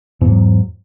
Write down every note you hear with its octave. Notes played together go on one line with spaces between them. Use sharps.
E2 G#2 F#3